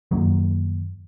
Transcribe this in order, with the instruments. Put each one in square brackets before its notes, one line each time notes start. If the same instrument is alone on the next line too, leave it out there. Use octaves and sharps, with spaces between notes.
[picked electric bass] F#2 D#3 F#3 A#3